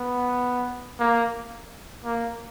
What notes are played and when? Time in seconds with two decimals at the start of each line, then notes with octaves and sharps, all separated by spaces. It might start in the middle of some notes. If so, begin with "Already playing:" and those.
Already playing: B3
1.00 A#3
2.05 A#3